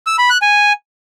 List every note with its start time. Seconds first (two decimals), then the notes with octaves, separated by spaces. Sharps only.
0.07 E6
0.18 B5
0.30 F#6
0.42 G#5